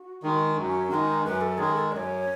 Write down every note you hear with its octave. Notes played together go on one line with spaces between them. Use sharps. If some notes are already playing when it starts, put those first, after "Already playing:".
Already playing: F#4
D#3 G#3
F#2 C#4
D#3 G#3 D#4 F#4
F#2 B4
A4
D#3 G#3 G#4
A4
F#2 C#5 D#5